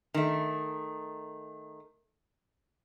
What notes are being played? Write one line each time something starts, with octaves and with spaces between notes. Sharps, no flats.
D#3 A3